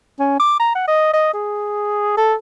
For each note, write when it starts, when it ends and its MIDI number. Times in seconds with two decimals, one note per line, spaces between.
0.20 0.36 61
0.40 0.57 86
0.59 0.72 82
0.75 0.86 78
0.88 1.09 75
1.13 1.33 75
1.34 2.13 68
2.17 2.34 69